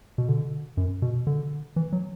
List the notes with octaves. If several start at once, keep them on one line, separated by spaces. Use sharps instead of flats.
B2
D3
F#2
B2
D3
E3
F#3